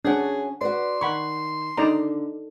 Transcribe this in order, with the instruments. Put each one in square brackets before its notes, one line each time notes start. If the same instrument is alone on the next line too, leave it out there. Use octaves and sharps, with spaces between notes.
[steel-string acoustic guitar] C#4 F#4 [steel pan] D4 F#5 [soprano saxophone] G#4
[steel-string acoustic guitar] F#4 B4 D5 [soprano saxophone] C6
[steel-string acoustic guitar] D#3 [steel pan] F#5 B5 C#6
[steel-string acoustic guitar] D3 [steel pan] D#4 D5 A#5